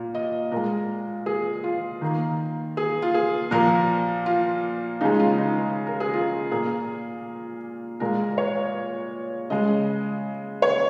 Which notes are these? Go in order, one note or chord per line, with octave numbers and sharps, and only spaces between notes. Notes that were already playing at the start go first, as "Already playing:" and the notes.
Already playing: A#2 A#3
D#5
A#2 G#3 A#4
G#4
F4
D#3 A#3
G#4
F4
G#4
A#2 F3 A#3 A#4
F4
C#3 G#3 D#4
F4
D#4
A#4
G#4
F4
A#2 A#3 G#4
A#2 G#3 A#4
C#5
C#3 G#3 D#5
C#5